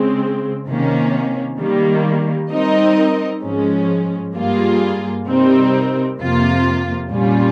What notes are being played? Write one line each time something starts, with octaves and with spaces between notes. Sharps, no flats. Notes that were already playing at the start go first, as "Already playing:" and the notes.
Already playing: C#3 G#3 C4
C3 D#3 A#3 C#4
D#3 G3 A#3
G3 C4 D#4 A#4 D#5
G#2 F3 G#3 C#4
G2 G3 A#3 F4 G#4
C3 G3 C4 D#4 A#4
F2 C3 F3 A#3 F4
A#2 G3 C#4 F4